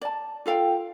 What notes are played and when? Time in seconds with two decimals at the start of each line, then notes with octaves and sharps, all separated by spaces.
0.02 D5 A5
0.46 F4 A4 F5 G5